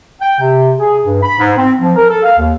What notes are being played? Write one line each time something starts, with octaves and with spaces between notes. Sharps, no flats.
G5
C3
G#4
G2
B5
G#2
C4
F3
A#4
A4
F5
D#2